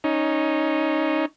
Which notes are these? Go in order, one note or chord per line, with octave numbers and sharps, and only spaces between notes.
C#4 D#4